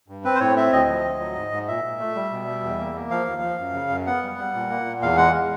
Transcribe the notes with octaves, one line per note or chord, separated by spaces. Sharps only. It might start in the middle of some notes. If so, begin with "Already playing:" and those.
G2
C4 B4
C5
A2 C#5
C4 E5
D2 D#5
F3
D2
F#3
G#2
G#2
A#2 E5
A#2
A3
G3
B2
G3
E2
A#3
A#3
F3 F5
D#2
F3
F#2
C#3
F#2
B3 F#5
G3
G3
A#2
A#3
A#2
E2 F5
G#3 F#5
G#3